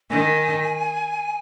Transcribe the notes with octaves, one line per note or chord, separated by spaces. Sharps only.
D#3 G#5